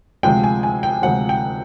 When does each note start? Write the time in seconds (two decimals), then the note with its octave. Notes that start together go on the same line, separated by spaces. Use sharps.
0.23 D2 C3 F3 G#3 G5
0.44 G#5
0.63 G#5
0.83 G5
1.02 D2 C3 F3 G#3 F#5
1.29 G5